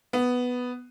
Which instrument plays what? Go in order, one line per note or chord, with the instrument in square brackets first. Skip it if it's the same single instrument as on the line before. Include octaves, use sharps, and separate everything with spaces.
[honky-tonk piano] B3